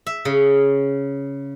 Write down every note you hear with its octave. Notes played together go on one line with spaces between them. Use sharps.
E5
C#3